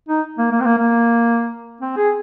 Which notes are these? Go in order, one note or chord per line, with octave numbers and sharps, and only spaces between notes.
D#4
A#3
A#3
C4
A#3
A#3
C4
G#4